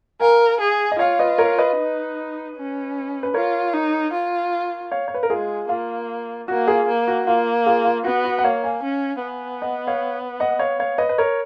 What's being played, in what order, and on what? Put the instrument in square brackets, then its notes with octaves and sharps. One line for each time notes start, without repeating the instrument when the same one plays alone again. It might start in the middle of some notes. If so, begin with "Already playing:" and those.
[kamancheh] A#4 [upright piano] F5 G#5
[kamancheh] G#4
[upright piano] D#5
[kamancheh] F4 [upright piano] C#5 F5
[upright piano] B4 D#5
A#4 C#5
B4 D#5
[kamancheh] D#4
C#4
[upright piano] B4
[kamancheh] F4 [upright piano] A#4 C#5
[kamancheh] D#4
F4
[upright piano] C#5 F5
C#5
B4
A#4
[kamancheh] G#3 [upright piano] F4 G#4
[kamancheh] A#3 [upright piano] F4
[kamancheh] A#3 [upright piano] F#4
[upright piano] F4 G#4
[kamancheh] A#3
[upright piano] F#4
[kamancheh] A#3 [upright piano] F4
[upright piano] F4 G#4
F4
[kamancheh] B3 [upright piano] F#4
[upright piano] F#4
F#5
[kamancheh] A#3 [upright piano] C#5 F5
[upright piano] F5 G#5
[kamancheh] C#4
B3
[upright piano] D#5 F#5
C#5 F5
D#5 F#5
C#5 F5
C#5 F5
B4 D#5
B4
A#4 C#5